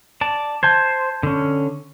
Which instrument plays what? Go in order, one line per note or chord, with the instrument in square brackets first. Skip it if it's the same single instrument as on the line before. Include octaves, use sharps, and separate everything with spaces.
[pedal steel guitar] D5 A5
[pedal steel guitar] C5 [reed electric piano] A5 G6 G#6
[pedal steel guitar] D3 C#4